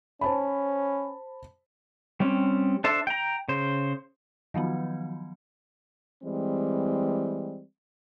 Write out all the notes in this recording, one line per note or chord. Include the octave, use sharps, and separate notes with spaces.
C#4 C5 A5 B5
G3 C4 C#4
D4 A4 C5 E5
G5 A#5
C#3 C5
D#3 F3 F#3 B3
E3 G3 G#3 C4